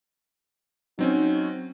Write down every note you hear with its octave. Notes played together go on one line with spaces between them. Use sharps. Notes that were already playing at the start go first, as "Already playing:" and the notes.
F#3 C4 C#4 D#4